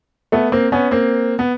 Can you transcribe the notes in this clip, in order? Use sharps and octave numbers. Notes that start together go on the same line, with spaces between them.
A3 B3
A#3 C4
B3 C#4
A#3 C4
B3